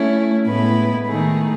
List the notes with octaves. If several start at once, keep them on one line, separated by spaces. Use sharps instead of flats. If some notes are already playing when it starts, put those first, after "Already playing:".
Already playing: A3 C#4 E4
A2 G#3 B3 E4 B4
D#3 A3 D#4 G#4